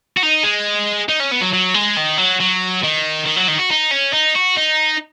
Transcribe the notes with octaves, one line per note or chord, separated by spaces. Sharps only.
F#4
D#4
G#3
D#4
C#4
B3
F#3
F#3
G#3
D#3
F#3
F#3
D#3
D#3
F#3
D#3
F#4
D#4
C#4
D#4
F#4
D#4